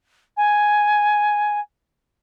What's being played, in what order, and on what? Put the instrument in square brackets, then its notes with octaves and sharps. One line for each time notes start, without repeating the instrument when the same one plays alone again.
[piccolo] G#5